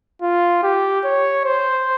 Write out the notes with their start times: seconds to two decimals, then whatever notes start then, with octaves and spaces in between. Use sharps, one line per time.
0.22 F4
0.63 G4
1.05 C#5
1.45 C5